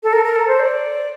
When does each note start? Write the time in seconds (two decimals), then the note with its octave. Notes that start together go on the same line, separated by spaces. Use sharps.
0.03 A4
0.12 A#4
0.24 A#4
0.35 A4
0.47 C5
0.59 D5